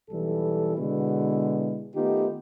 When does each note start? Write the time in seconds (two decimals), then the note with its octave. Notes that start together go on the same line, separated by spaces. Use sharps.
0.10 B1 E3 G3 A4
0.76 B2 D3 G#3 B3 E4 F#4
1.96 D#3 A3 B3 D#4 F4 G4